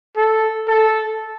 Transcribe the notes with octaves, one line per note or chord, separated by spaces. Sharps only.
A4
A4